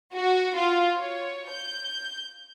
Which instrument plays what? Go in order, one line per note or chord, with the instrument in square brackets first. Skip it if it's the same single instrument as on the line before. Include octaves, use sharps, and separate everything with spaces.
[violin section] F#4
F4
C#5
G6